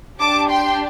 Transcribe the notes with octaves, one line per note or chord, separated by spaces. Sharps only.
D4 G4 A5 D6
G5 C6